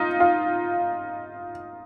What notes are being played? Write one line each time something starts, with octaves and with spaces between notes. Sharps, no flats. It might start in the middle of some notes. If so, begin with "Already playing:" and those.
Already playing: D#4 F4
F4